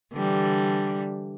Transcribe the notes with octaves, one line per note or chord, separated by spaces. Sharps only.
D3 E3 G3